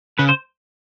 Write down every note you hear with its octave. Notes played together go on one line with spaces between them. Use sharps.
C#3 B4
C5